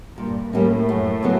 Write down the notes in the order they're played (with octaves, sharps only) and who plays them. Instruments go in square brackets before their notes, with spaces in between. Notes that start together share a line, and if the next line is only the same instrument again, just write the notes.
[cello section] G2 [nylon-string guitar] A#2
[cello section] A2 [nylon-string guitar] G3 A#3 C#4
[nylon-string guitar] F#2
C#3 F#3 B3